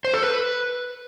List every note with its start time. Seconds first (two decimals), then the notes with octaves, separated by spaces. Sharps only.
0.05 C5
0.14 A4
0.23 B4